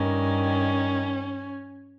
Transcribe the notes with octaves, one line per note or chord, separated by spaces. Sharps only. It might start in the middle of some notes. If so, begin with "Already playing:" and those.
Already playing: G2 D#3 C#4